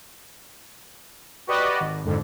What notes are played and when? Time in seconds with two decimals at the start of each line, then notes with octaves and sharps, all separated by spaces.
1.47 F#4 G4 B4 D5 D#5
1.80 G#1
2.04 F2 G#2 D3